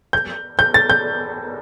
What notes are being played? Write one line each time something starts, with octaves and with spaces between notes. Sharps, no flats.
G6
G6
A6
G6